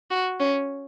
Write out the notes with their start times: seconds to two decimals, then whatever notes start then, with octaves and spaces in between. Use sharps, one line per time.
0.11 F#4
0.40 C#4